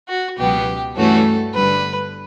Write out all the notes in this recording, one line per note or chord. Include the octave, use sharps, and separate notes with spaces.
F#4
C#2 B2 F#3 B3 G4
G2 E3 A3 C#4 F#4 A4
G1 G2 D3 B4